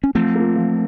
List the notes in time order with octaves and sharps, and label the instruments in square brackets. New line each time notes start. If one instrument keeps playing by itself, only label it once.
[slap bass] C#4
[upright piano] F3 [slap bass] A3 C4
[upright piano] A#3 F4
F3